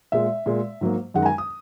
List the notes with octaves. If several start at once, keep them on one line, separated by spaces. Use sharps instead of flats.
A#2 G#3 E5
A#2 G#3
G#2 F#3 A#3
F#2 D#3 G#3 F#5
A#5
G#5
D#6